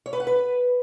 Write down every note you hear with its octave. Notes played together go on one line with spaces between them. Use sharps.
C#5
B4
F#5
B4